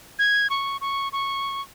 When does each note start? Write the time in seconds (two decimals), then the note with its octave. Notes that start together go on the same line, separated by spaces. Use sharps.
0.19 G#6
0.50 C#6
0.81 C#6
1.13 C#6